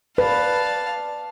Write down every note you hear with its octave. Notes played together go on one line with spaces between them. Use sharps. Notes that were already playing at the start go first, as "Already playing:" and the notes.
B4 D5 F5 A5